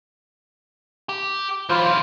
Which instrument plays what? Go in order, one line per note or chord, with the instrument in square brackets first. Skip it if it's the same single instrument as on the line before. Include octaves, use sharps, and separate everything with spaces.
[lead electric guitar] G4
[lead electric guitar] E3 F#3 [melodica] F4 C5